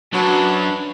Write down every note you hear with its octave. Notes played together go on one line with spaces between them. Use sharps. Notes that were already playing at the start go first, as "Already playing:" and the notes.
F#2 F#3 D4 B4 A5 B5